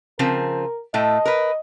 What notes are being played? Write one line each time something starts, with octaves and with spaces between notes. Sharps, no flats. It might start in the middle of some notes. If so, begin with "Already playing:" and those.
C#3 F3 C4 A#4
A2 A3 D#5
A#4 B4